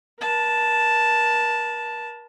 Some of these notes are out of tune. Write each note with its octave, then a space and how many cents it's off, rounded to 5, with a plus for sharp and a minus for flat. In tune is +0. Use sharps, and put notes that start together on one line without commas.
A#4 +40 A5 +0